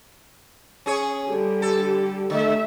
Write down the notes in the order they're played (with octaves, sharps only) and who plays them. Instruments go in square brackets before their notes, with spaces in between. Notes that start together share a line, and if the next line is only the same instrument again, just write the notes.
[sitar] C#4 G#4 C#5
[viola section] D3 G3 G4
[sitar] A4
[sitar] D3 [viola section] A3 E5